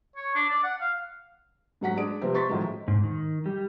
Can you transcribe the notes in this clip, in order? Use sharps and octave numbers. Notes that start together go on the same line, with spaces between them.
C#5
D4
D5
F#5
F5
G#2 F#3 F#5 B6
G#3 D4 G#4 D5 D7
C3 F3 G3 B3 C4
C6 C#6 A6 B6
A2 D#3 F3 F#3 G#3
G#2
D#3
G3